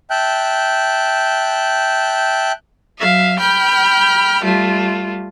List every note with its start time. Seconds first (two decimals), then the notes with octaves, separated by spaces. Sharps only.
0.10 E5 G5 A5 F#6 G6
2.99 F#3 E5 F5
3.39 G5 B5 F6 G6
4.43 G3 A3 F4